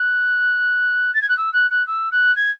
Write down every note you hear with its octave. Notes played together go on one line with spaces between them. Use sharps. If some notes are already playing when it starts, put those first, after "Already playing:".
Already playing: F#6
A6
G#6
F#6
E6
F#6
F#6
E6
F#6
G#6